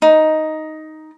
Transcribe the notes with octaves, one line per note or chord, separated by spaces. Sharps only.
D#4